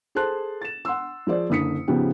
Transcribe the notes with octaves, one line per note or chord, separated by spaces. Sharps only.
G#4 A4 C5 A5 C6 F#6
A6 E7
F#5 C6 E6
F3 G#4 C5 D5
F#1 D3 D#6 B6 C#7
G#2 C#3 F3 B3 G4